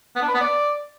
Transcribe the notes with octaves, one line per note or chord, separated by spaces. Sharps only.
B3
D4
B4
B3
D5